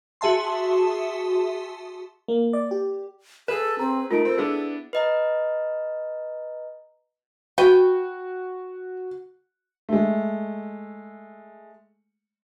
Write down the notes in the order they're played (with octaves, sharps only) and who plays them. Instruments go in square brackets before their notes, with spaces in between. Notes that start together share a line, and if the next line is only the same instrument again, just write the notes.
[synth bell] F#4 G#4 E5 A5 C6
[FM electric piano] A#3
D5
G4
[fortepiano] G#4 B4 [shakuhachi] A4 [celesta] E7
[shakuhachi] C4 [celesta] A#5
[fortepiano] A3 [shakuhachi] D#4 [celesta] F4 A#4 D7
[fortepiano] C4 [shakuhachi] A4
[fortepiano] B3 D4 E4 [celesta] G#4
[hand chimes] B4 D#5 A#5
[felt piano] F#4 [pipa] B4 G5
[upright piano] G#3 A3